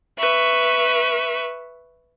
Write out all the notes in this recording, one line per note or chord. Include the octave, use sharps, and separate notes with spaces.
B4 E5 C#6